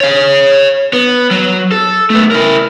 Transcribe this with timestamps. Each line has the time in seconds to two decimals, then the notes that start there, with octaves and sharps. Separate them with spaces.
0.01 C#5 F5
0.93 B3
1.31 F#3
1.72 A4
2.10 A3 B3
2.31 E4 A#4